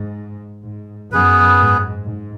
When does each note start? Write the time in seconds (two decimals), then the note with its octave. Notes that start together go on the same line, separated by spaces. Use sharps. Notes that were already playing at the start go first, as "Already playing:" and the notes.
Already playing: G#2
0.65 G#2
1.12 F#2 B3 G#4 B4
1.59 G#2
2.05 G#2